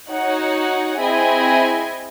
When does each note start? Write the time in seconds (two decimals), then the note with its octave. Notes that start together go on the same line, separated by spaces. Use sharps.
0.11 D#4 F#4 C#5 F#5
1.01 C4 E4 G#4 D#5 G#5